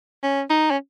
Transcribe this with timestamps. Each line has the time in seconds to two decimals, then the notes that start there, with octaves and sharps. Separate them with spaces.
0.23 C#4
0.50 D#4
0.71 C#4